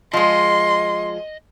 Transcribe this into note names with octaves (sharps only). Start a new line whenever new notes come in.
F3 G#3 D#5 C6